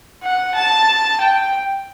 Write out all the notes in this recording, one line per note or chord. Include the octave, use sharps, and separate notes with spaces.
F#5
A5
G5